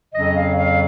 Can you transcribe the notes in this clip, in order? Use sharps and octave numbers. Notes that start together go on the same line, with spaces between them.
F2 C#3 F#3 C#4 D#5
F5
F5